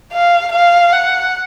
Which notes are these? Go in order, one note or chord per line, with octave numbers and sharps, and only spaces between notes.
F5
F5
F#5